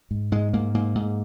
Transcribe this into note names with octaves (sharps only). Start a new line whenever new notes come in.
G#2
G#2 G#3
G#2 A#3
G#2 A#3
G#2